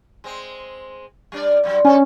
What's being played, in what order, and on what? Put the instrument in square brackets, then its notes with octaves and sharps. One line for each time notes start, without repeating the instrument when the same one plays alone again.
[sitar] G#3 C4
G3 D4 D5
G2 D3 F#3
[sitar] D3 A4 [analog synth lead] C#4